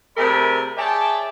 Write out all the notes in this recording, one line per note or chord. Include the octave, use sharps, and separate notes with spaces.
C3 A3 G#4 A#4 D5 B5
G#4 C#5 D5 E5 G5 A5